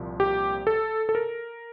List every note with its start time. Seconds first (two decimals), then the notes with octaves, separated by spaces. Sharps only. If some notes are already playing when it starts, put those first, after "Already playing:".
Already playing: C2 A#2 F3
0.20 G4
0.67 A4
1.09 A4
1.15 A#4